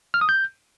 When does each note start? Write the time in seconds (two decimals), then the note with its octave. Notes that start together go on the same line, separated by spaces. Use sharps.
0.14 F6
0.21 D#6
0.29 G6